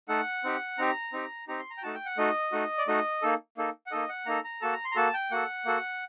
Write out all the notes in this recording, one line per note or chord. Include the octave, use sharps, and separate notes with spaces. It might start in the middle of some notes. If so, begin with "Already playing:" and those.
A3 D#4 A4 F#5
C4 D#4 G4
C4 D#4 G4 A#5
C4 D#4 G4
C4 D#4 G4 A#5
C6
A#5
G5
A3 D#4 F#4 A5
G5
F#5
A3 D#4 F#4 D#5
A3 D#4 F#4
D5
A3 D#4 F#4 D#5
A#3 D#4 A4
A#3 D#4 A4
F#5
A#3 D#4 A4 D#5
F#5
A#3 D#4 A4 A#5
A#5
A#3 F#4 A4 A5
A#5
C6
A#5
A#3 F#4 A4 A5
G5
A#3 F#4 A4 F#5
A#3 F#4 A4